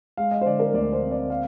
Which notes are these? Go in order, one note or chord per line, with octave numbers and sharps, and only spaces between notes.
G#3 F5
D#5
C5
D3 D5
A#4
D2 D5
C5
C4
D5
A#3 F5